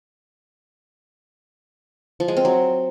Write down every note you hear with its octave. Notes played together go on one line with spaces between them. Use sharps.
F3
G#3
C4
F#3